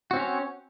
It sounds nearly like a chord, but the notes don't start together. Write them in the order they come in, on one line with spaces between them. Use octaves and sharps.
F#4 C4 C#4 C#5